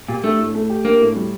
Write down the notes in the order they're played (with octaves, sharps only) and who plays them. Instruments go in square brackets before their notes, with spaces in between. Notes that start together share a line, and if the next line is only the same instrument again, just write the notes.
[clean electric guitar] A#2 [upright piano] G4
[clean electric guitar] A3 [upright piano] D4
[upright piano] A2
A3
G4
[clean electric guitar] A#3 [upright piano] D4
[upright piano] A2
G3